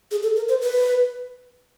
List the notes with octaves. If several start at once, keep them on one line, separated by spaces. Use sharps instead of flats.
G#4
A4
A#4
C5
B4